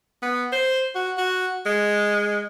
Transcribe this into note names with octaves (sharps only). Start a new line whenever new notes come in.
B3
C5
F#4
F#4
G#3